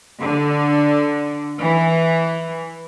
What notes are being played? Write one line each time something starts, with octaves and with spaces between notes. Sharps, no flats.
D3
E3